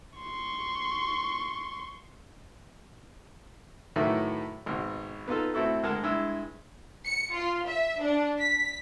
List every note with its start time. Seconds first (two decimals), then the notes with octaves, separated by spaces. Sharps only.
0.18 C6 C#6
3.96 A2 D#3 E3 F#3 A3
4.66 G#1 B2
5.28 B3 D#4 F4 A4
5.54 A3 C4 E4 F#4 A4
5.83 D2 G#3 A#4 F#5 A5
6.03 G2 G#3 E4 E6
7.05 C#7
7.35 F4
7.66 E5
8.01 D4
8.38 B6